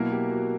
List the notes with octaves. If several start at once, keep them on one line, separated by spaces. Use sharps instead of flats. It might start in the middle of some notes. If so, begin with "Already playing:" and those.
Already playing: B2 F#3 A#3 E4 A#4
G4
F#4